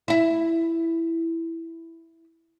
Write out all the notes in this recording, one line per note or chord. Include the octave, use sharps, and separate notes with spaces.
E4 E5